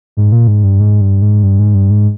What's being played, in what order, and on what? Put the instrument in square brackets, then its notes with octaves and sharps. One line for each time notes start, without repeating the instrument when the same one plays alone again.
[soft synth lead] G#2
A#2
G#2
G2
G#2
G2
G#2
G2
G#2
G2
G#2